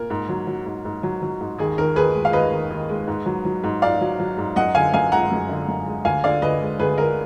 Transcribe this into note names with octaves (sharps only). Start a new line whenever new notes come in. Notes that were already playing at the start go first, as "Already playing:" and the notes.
Already playing: A#2 A#4
G#2
F#3
F#3
G#2
G#2
F#3
F#3
G#2
D#2 G#4
D#3 A#4
D#2 G#4 B4
G#3
F5
D#2 B4 D#5
D#3
D#2
G#3
G#2
F#3
F#3
G#2
G#2 D5 F5
F#3
F#3
G#2
F#2 D#5 F#5
D3 F5 G#5
F#2 F5 G#5
G#3 F#5 A#5
F#2
D3
F#2
G#3
D2 F5 G#5
D3 D5 F5
D2 B4 D#5
G#3
D2 G#4 B4
D3 A#4